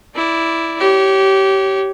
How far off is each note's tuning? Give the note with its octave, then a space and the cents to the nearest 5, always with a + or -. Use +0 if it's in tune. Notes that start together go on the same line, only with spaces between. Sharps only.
E4 +0 D5 -5
G4 -20 C#5 +0